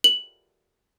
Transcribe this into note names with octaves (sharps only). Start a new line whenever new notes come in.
F#7